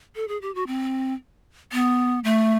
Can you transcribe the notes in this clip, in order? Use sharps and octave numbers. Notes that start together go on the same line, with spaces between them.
A4
G#4
G4
F#4
C4
B3
A3